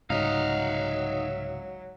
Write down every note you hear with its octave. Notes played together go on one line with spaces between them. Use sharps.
C2 G#2 C#3 F#3 D#4 E5 F5